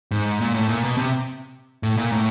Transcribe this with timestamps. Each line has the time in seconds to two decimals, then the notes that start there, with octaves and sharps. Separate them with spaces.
0.11 G#2
0.41 A#2
0.54 A2
0.69 A#2
0.83 B2
0.97 C3
1.83 A2
1.97 A#2
2.12 A2